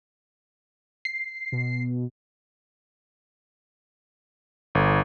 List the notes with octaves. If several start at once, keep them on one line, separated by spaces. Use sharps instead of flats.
C7
B2
G1